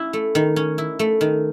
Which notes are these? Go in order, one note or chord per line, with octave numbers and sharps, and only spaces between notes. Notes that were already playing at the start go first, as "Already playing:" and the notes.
Already playing: C#4 E4
A3
D#3
C#4
E4
A3
D#3